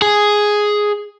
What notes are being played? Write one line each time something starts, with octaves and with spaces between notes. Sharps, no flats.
G#4